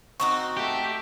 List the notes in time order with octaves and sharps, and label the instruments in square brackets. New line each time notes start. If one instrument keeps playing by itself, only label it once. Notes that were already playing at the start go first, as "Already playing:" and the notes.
[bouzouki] C4 D#4 F#4 [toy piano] C#6
[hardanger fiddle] A3 [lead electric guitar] G4